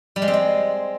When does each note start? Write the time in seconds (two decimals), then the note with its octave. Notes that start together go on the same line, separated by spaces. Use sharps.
0.16 G3
0.22 G#3
0.28 C4
0.33 G#3